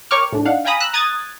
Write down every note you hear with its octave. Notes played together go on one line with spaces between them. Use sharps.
A#4 C#5 G5 C#6 D6 F6
A2 D4
D4 D#4 F5 F#5
F5 G5 G#5 A#5 B5 D#6
A#5 E6 F#6
A#5 D#6 F#6 G#6 A6